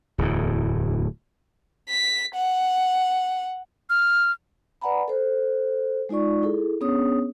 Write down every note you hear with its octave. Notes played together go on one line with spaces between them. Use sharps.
D1 E2 A2
B6
F#5
F6
B4 D5 F#5 G#5 A#5 B5
A4 C5
G#3 D#4 F4 D5 C#6
E4 G#4 A4
B3 C#4 D4 G#4 C#5 D#6